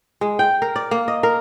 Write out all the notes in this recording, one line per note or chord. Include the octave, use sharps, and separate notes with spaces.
G#3
G5
A#4
D5
A#3
D#5
A#4